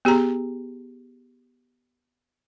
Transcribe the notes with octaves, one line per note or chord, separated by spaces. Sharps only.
B3 G4 G#4 A#5